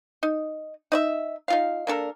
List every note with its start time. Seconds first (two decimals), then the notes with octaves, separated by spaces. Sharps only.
0.23 D#4
0.92 D#4 D5 E5
1.48 D#4 F4 F5
1.87 A#3 D4 A4 A#4